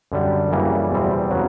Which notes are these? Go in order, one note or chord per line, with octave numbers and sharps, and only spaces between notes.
F#2 D3 G3
F#2 C#3 E3 G3 A#3
E2 B2 G3 C4
C#3 F#3